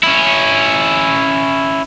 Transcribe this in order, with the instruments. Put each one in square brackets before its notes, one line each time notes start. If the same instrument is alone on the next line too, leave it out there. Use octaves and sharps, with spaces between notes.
[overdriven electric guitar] C#4 E4